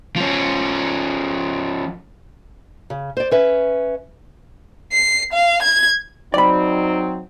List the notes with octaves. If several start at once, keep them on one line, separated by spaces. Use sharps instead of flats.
F3 C#4
C#3
C5 D5
C#4 B4 E5
C7
F5
G#6
F#3 C4 D#4 D5 B5